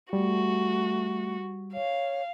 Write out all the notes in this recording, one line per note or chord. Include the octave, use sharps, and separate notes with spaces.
G3 A3 F#4
C#5 F5